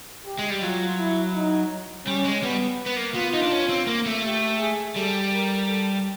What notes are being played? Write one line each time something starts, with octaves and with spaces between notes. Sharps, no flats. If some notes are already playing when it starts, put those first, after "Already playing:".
G4
G#3
G3
F#3 F4
E4
D#4
G3 C#4
G#3
G3 B3
B3
A#3
B3 F4
D#4
D4
C#4
C4
A#3
A3
G4
G#4
G3 A4
A#4
A4